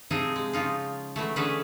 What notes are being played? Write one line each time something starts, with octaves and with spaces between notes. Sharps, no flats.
C3 F3 C4 D#4 G#4
G#3
C#3 F3 D#4 F4
E3 F#3 A3
D3 E3 C#4 G#4 A4 B4